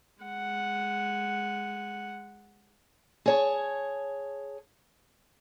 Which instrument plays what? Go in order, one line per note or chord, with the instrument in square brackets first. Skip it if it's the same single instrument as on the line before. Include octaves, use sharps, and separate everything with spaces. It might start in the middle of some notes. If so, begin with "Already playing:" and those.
[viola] G#3 F#5
[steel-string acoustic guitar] G#4 C#5 A5